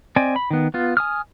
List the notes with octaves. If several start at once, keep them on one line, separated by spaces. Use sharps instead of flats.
C4 D5 D#5 G5 G#5
B5
D#3 B3
B3 F4
G#5 D#6 F6